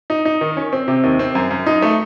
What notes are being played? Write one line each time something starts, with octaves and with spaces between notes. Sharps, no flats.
D#4
D#4
D#3
C#4
C4
C3
D#2
C4
F#2
F#2
D#4
A3